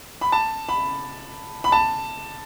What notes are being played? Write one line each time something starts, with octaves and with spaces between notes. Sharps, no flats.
B5
A5
B5
B5
A5